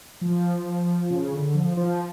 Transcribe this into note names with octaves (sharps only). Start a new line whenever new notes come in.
F3
C#3
D3
F3
F3